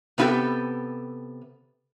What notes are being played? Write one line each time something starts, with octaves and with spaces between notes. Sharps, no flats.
C3 B3 E4 F#4 G4 A4